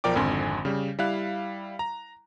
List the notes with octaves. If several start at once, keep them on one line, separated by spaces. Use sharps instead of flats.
B1 F3 A#4 D5 G5 D6
G#1 F2 D3 G#5 C6
C#3 G3
G3 E4 F5 F#6
A#5